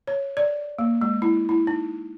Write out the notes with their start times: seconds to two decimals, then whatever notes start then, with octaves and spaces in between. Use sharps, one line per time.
0.07 C#5
0.37 D5
0.78 A#3
1.01 G#3
1.22 E4
1.49 E4
1.67 D#4